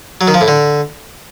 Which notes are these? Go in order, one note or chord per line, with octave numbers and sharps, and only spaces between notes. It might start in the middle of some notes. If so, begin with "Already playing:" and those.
F#3
D#3
F3
A2
D3